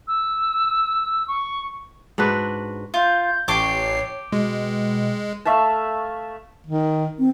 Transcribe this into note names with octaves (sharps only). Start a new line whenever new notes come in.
E6
C#6
G#2 D4 F#4 B4
F4 G6
A1 G4 C#5 A5 D6 C7
B2 G#3
A3 E5 F5 A5
D#3
C4